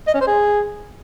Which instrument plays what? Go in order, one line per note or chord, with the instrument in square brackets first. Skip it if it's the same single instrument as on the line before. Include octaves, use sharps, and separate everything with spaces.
[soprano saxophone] D#5
C#4
C5
G#4